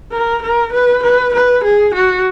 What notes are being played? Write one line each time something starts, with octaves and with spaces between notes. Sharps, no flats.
A#4
A#4
B4
B4
B4
G#4
F#4